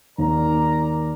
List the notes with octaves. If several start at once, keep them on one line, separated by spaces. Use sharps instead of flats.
D#2 A#4 D5 A#5